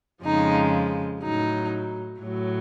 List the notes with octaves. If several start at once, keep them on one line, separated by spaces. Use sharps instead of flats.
F2 C#3 F3 G#3 D#4
A2 F#3 D#4
A2 F#3